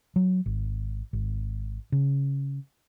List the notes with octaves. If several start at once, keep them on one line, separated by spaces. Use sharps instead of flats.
F#3
G#1
G#1
C#3